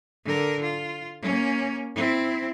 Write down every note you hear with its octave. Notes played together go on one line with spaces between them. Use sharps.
D3 A#4
F4
A#3 C#4
C4 E4